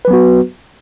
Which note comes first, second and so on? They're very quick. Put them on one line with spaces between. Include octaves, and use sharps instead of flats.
B4 F#3 B3 F#4